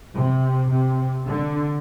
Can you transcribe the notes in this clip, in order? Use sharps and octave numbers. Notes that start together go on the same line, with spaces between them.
C3
C3
D3